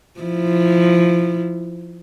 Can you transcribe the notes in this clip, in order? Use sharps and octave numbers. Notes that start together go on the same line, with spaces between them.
F3 E4